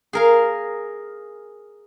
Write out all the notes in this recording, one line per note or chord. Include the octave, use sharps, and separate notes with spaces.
G#4 A#4 F5